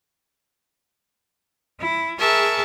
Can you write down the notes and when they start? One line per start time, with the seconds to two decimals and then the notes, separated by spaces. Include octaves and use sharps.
1.80 E4
2.19 G#4 A#4 E5 A5 C#6